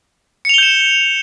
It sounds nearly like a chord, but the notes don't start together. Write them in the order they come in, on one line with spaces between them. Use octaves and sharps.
C#7 F7 G7 G6 E7